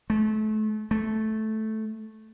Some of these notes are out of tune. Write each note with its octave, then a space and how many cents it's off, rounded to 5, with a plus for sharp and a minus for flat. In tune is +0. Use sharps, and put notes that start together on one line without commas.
A3 -30
A3 -10